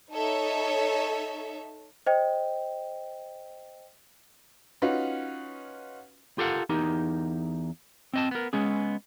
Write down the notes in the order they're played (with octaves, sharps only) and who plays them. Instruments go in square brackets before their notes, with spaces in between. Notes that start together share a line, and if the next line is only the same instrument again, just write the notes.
[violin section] D#4 A4 C#5 E5
[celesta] C5 D#5 G5
[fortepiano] C#4 D#4 F4 F#4 B4
[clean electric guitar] F4 G4 A4 A#4 F5 F#5
E2 D#4 G4 A#4
C4 D#5 A5
B3 A#4
G#3 B3 C#4 G#4